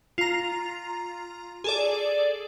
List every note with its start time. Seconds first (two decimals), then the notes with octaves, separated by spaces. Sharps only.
0.18 F4 A#5
1.64 G#4 A4 D5